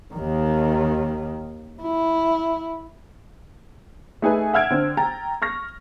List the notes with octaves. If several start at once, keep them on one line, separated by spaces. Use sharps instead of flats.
D#2 D#3
E4
A3 D#4 G#4 A4 B4 G#5
E5 F#5 E6 F6 G#6 D7
D3 C4
G5 A#5 A6
C#6 F6 A#6